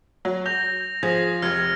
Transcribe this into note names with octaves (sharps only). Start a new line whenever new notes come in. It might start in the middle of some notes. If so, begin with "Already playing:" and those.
F#3
G6 A#6 F7
F3 G#4 A#6
F1 F6 G#6